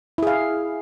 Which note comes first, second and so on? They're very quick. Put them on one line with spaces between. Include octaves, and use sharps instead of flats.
E4 G#4 F5